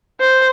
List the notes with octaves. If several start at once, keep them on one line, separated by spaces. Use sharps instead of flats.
C5